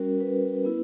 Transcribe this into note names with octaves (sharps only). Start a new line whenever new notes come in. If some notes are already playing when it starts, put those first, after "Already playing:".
Already playing: G3 C#4 F#4 A#4
B4
B3 E4